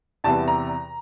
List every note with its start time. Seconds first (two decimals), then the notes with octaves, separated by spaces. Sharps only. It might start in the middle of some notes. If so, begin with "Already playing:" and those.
0.24 E2 C3 E3 G3 B3 A5
0.48 A#5